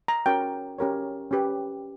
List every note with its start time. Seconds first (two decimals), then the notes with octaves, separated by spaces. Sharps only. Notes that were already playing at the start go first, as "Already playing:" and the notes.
0.08 A#5
0.26 C#4 F#4 A#4 C#5 G5
0.78 C#4 G4 A#4 C#5
1.31 C#4 G4 B4